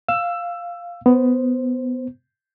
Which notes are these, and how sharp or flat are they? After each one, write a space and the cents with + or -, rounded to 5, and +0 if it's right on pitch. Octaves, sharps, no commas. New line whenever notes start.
F5 +0 E6 +15
B3 +15 C5 +0